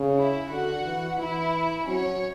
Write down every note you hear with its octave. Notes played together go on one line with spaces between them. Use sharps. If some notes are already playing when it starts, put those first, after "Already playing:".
Already playing: C#3
E4 E5
D3 F#4 F#5
E3
E3 E4 E5
F#3 C#4 C#5